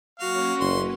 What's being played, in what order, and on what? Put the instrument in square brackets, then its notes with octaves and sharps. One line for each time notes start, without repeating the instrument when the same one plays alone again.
[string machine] F#3 A#3 C#4 [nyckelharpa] F#4 [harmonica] F5
[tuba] F#1 [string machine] B4 [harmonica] C6